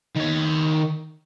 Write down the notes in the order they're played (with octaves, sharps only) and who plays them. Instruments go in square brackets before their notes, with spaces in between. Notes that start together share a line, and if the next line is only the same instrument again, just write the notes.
[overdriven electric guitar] D#3 C#5